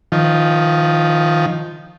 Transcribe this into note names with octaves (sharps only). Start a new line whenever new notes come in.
D#3 F3